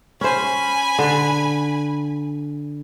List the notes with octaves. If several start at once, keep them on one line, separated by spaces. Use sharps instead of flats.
C#4 C5 G#5 B5
D3